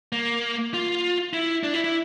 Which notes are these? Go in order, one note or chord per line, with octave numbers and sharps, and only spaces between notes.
A#3
F4
E4
D4
E4
E4